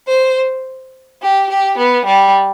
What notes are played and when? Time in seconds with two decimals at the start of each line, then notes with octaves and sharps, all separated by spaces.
0.08 C5
1.21 G4
1.49 G4
1.78 B3
2.06 G3